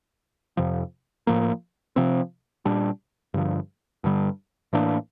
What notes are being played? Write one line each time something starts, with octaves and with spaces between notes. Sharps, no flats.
F2 C3 F3
A2 F3 A#3
C3 F3 C4
A#2 G3 D4
G2 D3 F3
G2 D3 G3
A2 E3 A#3 D4